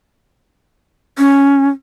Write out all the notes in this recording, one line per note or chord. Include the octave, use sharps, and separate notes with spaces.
C#4